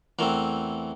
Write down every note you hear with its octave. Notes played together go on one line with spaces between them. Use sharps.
E2 E3 A3 C4 A#4